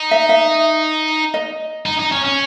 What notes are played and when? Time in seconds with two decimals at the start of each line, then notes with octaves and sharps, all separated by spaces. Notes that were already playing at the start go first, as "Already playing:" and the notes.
Already playing: D#4
0.11 E5
0.29 E5
1.34 D#5
1.86 D#4
1.99 D#4
2.12 C#4
2.25 C#4